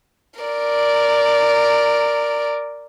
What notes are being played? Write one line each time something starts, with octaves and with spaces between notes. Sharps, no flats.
A#4 D5